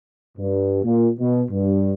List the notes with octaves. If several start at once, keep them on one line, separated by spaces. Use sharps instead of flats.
G2
A#2
B2
G2